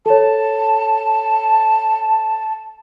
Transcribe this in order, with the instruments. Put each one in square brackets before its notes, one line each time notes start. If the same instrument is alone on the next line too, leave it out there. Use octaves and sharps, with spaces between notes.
[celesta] A4 C#5 [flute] A5